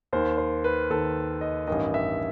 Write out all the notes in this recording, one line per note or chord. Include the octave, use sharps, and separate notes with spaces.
D#2 D#3 C5
C5
B4
D#2 D#3 A4
D#5
A1 G2 D#3 D#5
E5